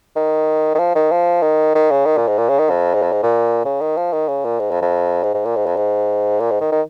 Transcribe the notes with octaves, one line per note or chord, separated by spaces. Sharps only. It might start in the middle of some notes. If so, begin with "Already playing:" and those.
D#3
D#3
F3
D#3
F3
D#3
D#3
C#3
D#3
A#2
G#2
A#2
C#3
D#3
F2
G#2
F2
G#2
A#2
C#3
D#3
F3
D#3
C#3
A#2
G#2
F2
F2
G#2
G#2
A#2
G#2
F2
G#2
A#2
G#2
D#3
D#3